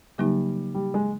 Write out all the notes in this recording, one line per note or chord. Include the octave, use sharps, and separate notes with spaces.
C#3 F#3 G3 A#3 D#4
G3
G#3